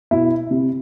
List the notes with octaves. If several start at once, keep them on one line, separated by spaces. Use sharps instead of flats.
B2 E4
C3